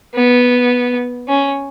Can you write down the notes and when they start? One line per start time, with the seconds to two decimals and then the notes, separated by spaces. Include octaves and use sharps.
0.14 B3
1.28 C#4